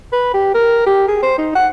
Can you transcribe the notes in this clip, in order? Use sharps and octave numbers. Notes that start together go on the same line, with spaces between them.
B4
G4
A#4
G4
G#4
C5
D#4
F#5